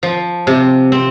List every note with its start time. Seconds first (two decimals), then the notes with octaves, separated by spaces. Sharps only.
0.03 F3
0.47 C3
0.92 C4